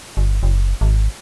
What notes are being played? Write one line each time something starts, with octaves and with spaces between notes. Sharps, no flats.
G1
F#1
G#1